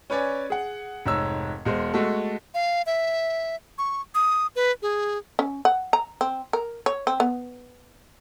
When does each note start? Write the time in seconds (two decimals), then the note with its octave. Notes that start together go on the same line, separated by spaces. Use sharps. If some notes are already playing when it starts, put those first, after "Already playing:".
0.10 C#4 B4 C#5 D5 G#5
0.50 G#4 F#5
1.06 F1 G#2 C#5 E6
1.65 E1 G#3 C5
1.94 G#3 A3 F#4 A4
2.54 F5
2.86 E5
3.78 C#6
4.15 D#6
4.56 B4
4.82 G#4
5.39 C#4
5.65 F#5
5.93 A#5
6.21 C4
6.53 A#4
6.86 C#5
7.07 C4
7.20 B3